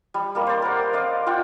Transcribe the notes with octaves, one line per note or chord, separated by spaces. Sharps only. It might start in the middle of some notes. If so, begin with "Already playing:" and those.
G3
G3 A#3 D#5
C5 D5
A#4 F#5
D5 D#5 F5
F4 D5 F#5 G5